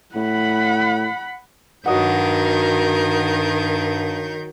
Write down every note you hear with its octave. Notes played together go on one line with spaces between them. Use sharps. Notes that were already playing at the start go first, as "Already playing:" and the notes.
A2 F#5 B5
G2 D#3 F#3 A#4 D#5 F#5 G6